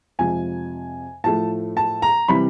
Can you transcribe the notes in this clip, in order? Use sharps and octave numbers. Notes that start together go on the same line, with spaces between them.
F2 C3 F3 G#3 G#5
A2 F3 A3 A5
A5
A#5
C3 E3 G3 B5